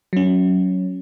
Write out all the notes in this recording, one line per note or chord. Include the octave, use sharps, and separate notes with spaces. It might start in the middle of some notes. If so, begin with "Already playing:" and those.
F#3 C#4